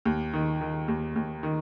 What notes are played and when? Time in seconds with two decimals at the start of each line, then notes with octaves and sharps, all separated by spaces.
0.05 D#2
0.33 D#3
0.61 D#3
0.88 D#2
1.16 D#2
1.43 D#3